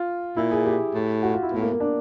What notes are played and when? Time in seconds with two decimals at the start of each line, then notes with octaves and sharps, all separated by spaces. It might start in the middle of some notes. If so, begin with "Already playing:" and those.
Already playing: F4
0.37 A#2 E4
0.51 G#4
0.65 G4
0.94 A2
1.23 F#4
1.33 F4
1.42 E4
1.52 A2 B3
1.61 A#3
1.71 A#3
1.80 D4